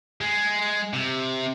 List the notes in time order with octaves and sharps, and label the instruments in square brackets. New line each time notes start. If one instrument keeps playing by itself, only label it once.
[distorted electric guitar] G#3
C3